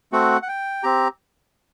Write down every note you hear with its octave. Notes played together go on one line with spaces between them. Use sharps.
A3 C4 F#4 F#5
F#5
G5
C4 G4 A#5